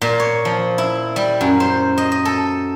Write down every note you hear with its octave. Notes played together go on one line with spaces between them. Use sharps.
A#2
C#5
F3
E4
G3
F#2
C5
D#5
D#5
A4